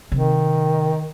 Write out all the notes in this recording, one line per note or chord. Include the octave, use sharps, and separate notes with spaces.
C3 D#3